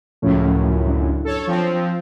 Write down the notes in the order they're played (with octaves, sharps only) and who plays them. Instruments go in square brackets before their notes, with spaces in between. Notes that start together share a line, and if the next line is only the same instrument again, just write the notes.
[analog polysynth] C#2 F#2 A2 [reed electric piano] F3 A3 C#4
[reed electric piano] F#3 D4
[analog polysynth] A4 C#5
F3 C4